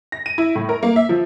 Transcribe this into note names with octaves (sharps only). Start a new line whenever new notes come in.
A#6
D#7
E4
A2
A#4
A#3
E5
F3